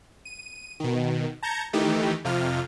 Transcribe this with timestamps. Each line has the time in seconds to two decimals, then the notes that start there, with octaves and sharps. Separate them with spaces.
0.25 D#7
0.80 B2 D#3
1.43 A5 A#5 G6 G#6 A#6 C#7
1.73 D#3 E3 A3 D#4 G4
2.25 F2 C3 F4 F6